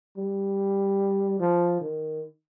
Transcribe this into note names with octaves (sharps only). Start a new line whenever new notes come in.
G3
F3
D#3